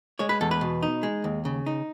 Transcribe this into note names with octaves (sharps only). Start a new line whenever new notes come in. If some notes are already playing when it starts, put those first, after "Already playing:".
G#3 C#5
B4
E2 A4
B4
B2
D#4
G#3
D#2
C#3
D#4